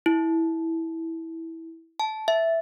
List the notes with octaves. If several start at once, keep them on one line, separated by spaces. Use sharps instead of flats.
E4
A5
E5